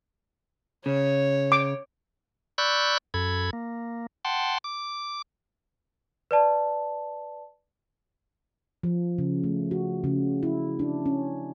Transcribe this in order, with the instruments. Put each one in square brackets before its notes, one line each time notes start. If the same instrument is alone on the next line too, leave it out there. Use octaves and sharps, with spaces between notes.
[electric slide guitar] C#3 [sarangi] C#5
[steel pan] D6
[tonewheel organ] D5 B5 C#6 E6 F#6 G6
F#2 A4 B5 G#6
A#3
F#5 G5 A5 C6
D6
[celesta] B4 D5 A5
[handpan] F3
C#3
A3
F#4
C#3
E4
D4
C#4